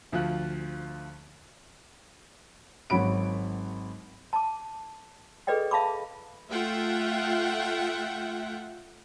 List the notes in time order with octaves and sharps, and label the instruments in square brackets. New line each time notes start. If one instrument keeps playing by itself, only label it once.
[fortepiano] D2 F3 F4 F#6
[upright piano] G#1 F#3 F#4 C#5 B5 D7
[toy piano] A5 D6
G#4 A4 B4 D5 D#5 G5
E5 F5 A5 B5 D6
[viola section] A3 F4 E5 F#5 G5